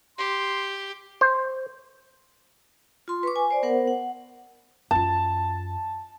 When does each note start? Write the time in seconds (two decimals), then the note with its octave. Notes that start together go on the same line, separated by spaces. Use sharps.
0.18 G4 C6
1.21 C5
3.08 F4 C6
3.23 B4 C#6 D6
3.36 G#5
3.51 C5 D5
3.63 B3 A#4 C5 F#5
3.87 F#5
4.91 F#2 F4 A5